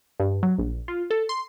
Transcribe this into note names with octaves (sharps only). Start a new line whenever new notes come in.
G2
F#3
A#1
F4
A4
C6